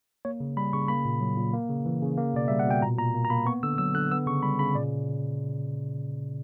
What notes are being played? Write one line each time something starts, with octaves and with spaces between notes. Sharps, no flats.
A#3 C#5
C#3
G3 B5
C#3 C#6
A#3 B5
A#2
F#3
A#2
A#3
C#3
E3
C#3
A#3
B2 D5
G3 E5
F#5
B2 G5
A#2 A#5
A#2 A#5
A#3
A#5
A#3 B5
B3 C#6
D3 E6
F#3 E6
D3 F#6
B3 E6
C#3 C#6
G3 B5
C#3 B5
A#2 D5